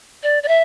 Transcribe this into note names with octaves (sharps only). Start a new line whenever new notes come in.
D5
D5
E5